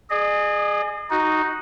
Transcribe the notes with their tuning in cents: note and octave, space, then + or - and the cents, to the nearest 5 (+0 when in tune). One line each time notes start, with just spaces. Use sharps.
G#4 +0 D#5 -45
D#4 +0 F#4 +0